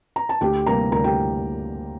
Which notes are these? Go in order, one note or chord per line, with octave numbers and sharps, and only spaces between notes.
A#5
A5
D2 G4 G5
C3 G3 A#3 A#4 A#5
D2 A#4 A#5
G4 G5